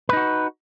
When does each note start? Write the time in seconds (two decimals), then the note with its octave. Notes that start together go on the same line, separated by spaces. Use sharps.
0.09 B4
0.13 D#4
0.17 F#4